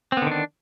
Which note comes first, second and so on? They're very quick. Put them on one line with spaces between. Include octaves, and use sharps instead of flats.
C4 B3 D3 D#3 D4